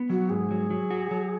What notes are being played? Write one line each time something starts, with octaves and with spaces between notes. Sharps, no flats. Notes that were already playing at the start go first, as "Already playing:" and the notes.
Already playing: B3
F#3 F#4
G#2 G#4
F#3
F#3
F#4
F#3